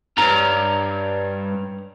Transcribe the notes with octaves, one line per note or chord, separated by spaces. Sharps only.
G2 C#5 A#5